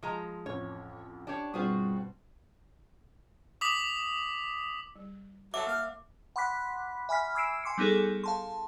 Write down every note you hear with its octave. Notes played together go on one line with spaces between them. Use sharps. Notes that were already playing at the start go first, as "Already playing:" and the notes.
F3 G#3 A#5
A1 F2 C#5
D4 G4 C#5
G2 B2 G3 C4 F4 F#4 G#4
D6 D#6 B6 F#7
G3
F#3 A4 C#5 E5 F#5 A5 D6
A#3 A#4 F5
F#5 B5 C6 D6 F#6 B6
E5 G#5 B5 F6 B6
D6 E6 G#6 C7 D7 E7
G#5 C6 D6 C7 C#7
G3 B3 D#4 G#4 A4
F5 A5 C6